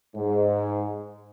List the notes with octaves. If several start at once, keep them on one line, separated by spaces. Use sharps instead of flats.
G#2